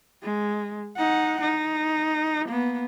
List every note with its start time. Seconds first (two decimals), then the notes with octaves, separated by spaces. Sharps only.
0.23 G#3
0.97 D#4 F#5
1.41 D#4
2.48 A#3 B3